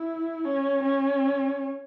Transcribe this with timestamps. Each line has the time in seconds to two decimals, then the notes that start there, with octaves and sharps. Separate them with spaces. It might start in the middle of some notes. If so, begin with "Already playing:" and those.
Already playing: E4
0.45 C#4
0.83 C#4